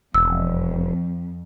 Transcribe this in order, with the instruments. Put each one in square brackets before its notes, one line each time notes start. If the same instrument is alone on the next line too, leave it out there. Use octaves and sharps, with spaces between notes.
[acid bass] E1 [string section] F2 [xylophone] E6